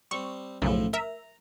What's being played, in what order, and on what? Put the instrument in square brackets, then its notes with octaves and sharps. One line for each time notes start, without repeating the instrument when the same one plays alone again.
[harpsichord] G3 C4 [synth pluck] C#6
[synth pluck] B1 F#2 C#3 [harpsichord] A2 F3 A3
[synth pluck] A#4 E5 [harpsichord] A#5